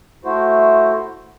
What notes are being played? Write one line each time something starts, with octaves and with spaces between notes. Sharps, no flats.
A3 E4 F#4 C5